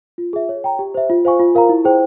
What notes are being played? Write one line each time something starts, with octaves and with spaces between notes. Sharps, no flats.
F4
G#4 E5
C#5
G5 A#5
G4
C5 E5
F4
C5 F5 G#5 C#6
F4
A#4 F5 A#5
E4
G#4 C5 G5